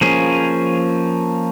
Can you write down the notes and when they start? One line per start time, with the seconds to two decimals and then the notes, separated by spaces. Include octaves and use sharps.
0.01 F3 A#3 C#4 G#4